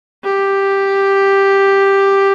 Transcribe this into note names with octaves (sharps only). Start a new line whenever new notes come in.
G4